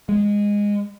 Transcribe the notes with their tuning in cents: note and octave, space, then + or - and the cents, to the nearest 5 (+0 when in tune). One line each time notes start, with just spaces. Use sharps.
G#3 -15